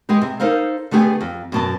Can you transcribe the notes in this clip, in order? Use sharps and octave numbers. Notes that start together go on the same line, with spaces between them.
G#3 B3 G4
C3
D#4 A4 A#4 C5 F5
D3 A3 B3 G4 G#4
F2
F#2 B2 A5